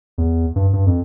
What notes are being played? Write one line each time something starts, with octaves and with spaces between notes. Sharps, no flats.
E2
G2
G2
F2